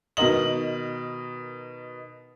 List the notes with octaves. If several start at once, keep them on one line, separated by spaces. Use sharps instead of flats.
B2 D#3 A#4 D#5 F#7